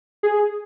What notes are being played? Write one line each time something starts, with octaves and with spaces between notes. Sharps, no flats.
G#4